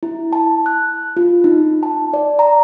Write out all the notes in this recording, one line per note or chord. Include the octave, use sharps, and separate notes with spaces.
E4
A5
F#6
F4
D#4
A5
D5
A#5